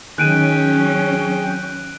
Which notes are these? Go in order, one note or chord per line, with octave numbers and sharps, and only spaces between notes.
D#3 F#3 C#4 G#4 G5 F#6 D7 D#7